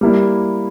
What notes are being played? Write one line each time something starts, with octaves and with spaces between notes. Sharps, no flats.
G3 A#3 E4